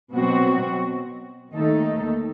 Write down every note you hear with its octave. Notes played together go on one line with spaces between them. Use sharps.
B2 F#3 C4 F#4
D#2 D#3 A3 D#4 A4